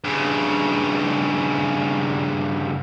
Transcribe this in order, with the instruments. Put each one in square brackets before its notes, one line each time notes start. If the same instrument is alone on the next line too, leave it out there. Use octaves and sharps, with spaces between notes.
[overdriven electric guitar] G2 C#3